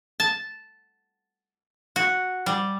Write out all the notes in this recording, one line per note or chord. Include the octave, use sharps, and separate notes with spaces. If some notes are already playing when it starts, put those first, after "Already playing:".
A5
F#4
G3